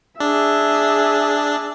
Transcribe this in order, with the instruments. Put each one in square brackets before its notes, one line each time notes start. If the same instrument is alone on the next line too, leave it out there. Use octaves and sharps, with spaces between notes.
[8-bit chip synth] D4 [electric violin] G#4 E5